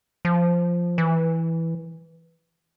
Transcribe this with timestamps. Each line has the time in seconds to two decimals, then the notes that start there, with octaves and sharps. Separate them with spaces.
0.25 F3
0.98 E3